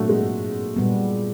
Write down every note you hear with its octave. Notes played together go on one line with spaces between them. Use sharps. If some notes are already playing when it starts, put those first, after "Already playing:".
Already playing: A#2 F#3 A3 A#3 D4 F#4
G#3
A#2 G3 B3